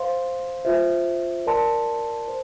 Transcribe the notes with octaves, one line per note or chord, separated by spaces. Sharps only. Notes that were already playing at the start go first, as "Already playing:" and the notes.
Already playing: C5 F5 C6
F4 C5 E5
A#4 D5 A5 C6
C5